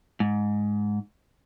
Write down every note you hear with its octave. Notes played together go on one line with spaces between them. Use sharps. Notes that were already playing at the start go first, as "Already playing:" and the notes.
G#2